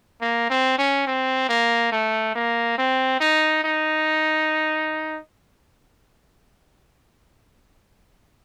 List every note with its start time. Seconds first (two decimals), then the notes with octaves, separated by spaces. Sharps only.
0.21 A#3
0.50 C4
0.79 C#4
1.07 C4
1.49 A#3
1.92 A3
2.35 A#3
2.78 C4
3.20 D#4
3.64 D#4